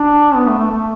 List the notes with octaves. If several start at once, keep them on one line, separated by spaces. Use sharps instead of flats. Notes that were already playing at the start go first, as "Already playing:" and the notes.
Already playing: D4
B3
A3
A3
A3